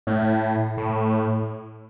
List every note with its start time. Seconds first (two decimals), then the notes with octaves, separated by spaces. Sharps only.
0.07 A2
0.77 A2